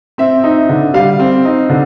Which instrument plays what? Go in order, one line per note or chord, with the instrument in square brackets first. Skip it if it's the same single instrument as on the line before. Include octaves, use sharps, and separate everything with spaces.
[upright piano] C4 E5
D#4
D3
G3 F5
C4
D#4
D3